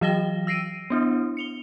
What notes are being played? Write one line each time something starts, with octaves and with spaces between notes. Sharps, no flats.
E3 F#3 D#5 G5 A#6 G7
E6 A#6 C7 D7 D#7
B3 D4 E4
C#7 F7 G7